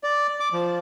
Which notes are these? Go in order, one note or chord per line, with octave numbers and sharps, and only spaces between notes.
D5
D6
F3